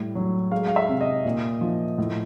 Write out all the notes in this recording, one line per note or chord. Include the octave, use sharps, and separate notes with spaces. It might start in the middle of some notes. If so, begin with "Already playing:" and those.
Already playing: A2 G3
F#3
G#3 F5
F5
E5
C3
D#5
A#2
F3
A2